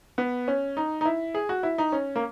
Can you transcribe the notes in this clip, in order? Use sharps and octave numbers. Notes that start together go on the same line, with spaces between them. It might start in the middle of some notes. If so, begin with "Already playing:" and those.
B3
C#4
D#4
D#4
E4
G#4
F#4
E4
D#4
C#4
A#3